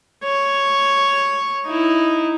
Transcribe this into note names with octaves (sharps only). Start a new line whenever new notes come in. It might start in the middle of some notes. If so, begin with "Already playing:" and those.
C#5
D#4 E4